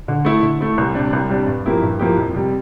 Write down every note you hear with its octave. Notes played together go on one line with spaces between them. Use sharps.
D3
A3 E4
D3
A3 E4
C2
C3 G3 D4
C2
C3 G3 D4
G2
F3 A#3 E4 G4
G2
F3 A#3 E4 G4
F2
C3 G3